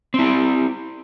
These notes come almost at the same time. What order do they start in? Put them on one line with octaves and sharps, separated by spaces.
C4 E4 G4